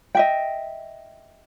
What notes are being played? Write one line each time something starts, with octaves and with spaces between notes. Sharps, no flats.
D#5 E5 G5